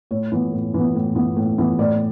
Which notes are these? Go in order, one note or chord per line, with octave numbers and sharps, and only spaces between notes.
A2 C#5
E3 B3
A2
E3 B3
A2
E3 B3
A2
E3 B3
A2 D5